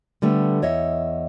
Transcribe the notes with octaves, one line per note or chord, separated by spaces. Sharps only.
D3 G3 A3 B3
E2 C#5 D#5 E5